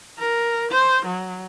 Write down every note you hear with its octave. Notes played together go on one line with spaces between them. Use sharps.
A#4
C5
F#3